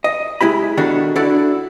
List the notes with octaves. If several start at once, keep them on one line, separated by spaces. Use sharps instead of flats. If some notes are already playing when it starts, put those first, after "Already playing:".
D#5
G#3 E4 G4 B5
B2 D#3 D4 F#4 A4 A#4
D4 E4 F#4 A4 D5